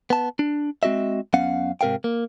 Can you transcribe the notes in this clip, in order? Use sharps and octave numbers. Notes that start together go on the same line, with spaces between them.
B3 A5
D4
G#3 C4 F#4 D#5 E5
F#2 B3 C#4 F5 F#5
G#2 C3 A#4 F5 G5
A#3